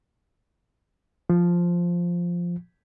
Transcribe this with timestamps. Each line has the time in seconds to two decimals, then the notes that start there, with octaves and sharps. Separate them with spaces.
1.30 F3